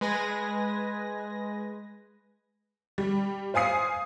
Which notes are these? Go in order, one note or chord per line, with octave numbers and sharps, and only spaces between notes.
G#3 B4 G#5 A#6
G3
C5 F5 G#5 D#6 C7